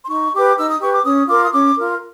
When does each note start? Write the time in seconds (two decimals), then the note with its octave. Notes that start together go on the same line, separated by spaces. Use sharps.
0.03 C6
0.09 D#4 C#6
0.33 G4 B4 D6
0.57 D#4 E6
0.69 D#6
0.81 G4 B4 C#6
0.93 D6
1.04 C#4 D#6
1.28 F4 A#4 D6
1.44 D#6
1.52 C#4 D6
1.77 F4 A#4